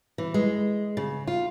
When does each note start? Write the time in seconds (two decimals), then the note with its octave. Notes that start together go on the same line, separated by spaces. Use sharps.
0.18 E3
0.34 G#3
0.97 C#3
1.27 F4